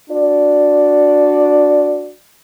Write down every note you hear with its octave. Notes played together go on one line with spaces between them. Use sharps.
D4 F#4 D5